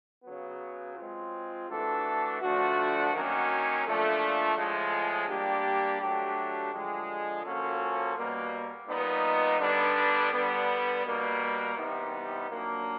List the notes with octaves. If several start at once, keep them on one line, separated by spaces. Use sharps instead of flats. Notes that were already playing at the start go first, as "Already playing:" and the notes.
C#3 F#3 B3
G#3 C4 F4
E3 A3 D4 F#4 A4
D3 F3 A3 D4 F#4
D#3 F#3 A#3 C#4
A#2 F3 A3 D4
A2 F3 G#3
G3 A#3 D4 G4
F#3 A3 D4 G4
D3 F3 G#3
F3 A#3 C#4 F#4 A4
B2 G3 A#3
A#2 G3 B3 D#4
D3 G3 B3 D4
D3 G3 B3
B2 G3 A#3
C3 E3 G3 B3 D#4
A#2 F#3 A#3 D4